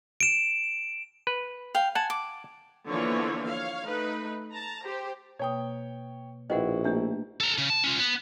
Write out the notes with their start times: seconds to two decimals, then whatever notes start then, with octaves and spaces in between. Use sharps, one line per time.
0.20 D7 E7
1.27 B4
1.75 F5 G5
1.95 F#5 G#5 A5
2.10 D6
2.88 D3 E3 F3 A#3 B3 C#5
3.47 C#5 F5
3.83 A3 D#4 B4
4.52 A5 A#5
4.84 G4 C5
5.39 B2 A#3 C#5 G5 D#6
6.50 A#1 D#4 E4 F#4 B4 D#5 F#5 G5
6.84 A3 A#3 D4 G4 E5
7.40 A4 A#5
7.58 C#3
7.70 A5
7.84 C#4 F4
7.99 B3